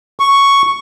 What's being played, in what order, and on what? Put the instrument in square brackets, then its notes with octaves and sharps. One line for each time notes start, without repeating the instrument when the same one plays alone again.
[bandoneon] C#6